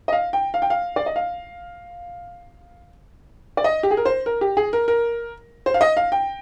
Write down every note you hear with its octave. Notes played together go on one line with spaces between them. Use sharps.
D#5
F5
G5
F5
G5
F5
D5
D#5
F5
D5
D#5
G4
G#4
A#4
C5
A#4
G4
G#4
A#4
A#4
C5
F5
D#5
F5
G5